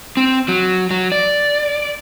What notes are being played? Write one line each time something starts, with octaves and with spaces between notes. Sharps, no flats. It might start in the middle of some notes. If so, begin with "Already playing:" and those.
C4
F#3
F#3
D5